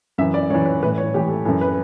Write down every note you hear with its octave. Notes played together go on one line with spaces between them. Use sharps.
F#2 E3 E5
D5
F#2 E3 C#5
B4
A2 E3 B4
C#5
A2 E3 G4
A4
F#2 E3 A4
B4